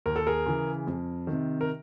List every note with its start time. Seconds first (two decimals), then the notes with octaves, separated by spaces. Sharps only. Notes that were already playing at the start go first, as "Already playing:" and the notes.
0.06 D#2 A#4
0.16 A4
0.27 G#4 A#4
0.46 C#3 E3
0.87 F2
1.27 C3 D#3
1.61 A#4